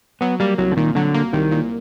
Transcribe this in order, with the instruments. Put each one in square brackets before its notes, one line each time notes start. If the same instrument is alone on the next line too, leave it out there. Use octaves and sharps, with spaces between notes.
[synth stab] F#3 [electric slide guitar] B3
[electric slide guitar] G3 [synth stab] A#3
[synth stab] C2 [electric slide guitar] F#3
[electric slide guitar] D3
[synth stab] A#2 [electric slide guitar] D#3
[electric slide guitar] D3 [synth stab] F#3
[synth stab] A#3
[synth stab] C2 [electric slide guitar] D#3
[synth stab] A#2